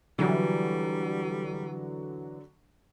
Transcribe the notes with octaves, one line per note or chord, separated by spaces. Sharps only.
D3 E3 F#3 G3